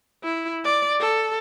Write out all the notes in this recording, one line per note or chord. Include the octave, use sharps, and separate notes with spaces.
E4
D5
A4